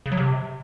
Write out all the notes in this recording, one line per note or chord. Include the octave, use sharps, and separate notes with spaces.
C#3
F#3
C3